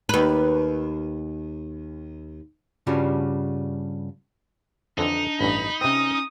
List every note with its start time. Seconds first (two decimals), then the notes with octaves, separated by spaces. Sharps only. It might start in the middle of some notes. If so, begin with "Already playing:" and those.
0.09 D#2 B4
2.87 G2 C#3 G3 D4 F4 F#4
4.98 F2 D3 E3 D4 D#4
5.41 A1 G2 B5
5.81 C3 C4 C#4 D#6